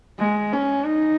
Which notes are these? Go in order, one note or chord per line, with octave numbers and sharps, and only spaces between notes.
G#3
C#4
D#4